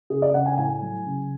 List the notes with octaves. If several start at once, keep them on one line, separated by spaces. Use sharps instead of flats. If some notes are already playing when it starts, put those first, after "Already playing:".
C#3 G#4
D5
C#3 F#5
G#5
A2 G#5
F#3
C#3